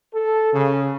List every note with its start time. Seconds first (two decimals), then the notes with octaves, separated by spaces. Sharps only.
0.14 A4
0.52 C#3